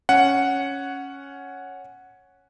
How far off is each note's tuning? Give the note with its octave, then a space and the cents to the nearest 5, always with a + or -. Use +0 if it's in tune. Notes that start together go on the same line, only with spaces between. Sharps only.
C#4 +0 F#5 +0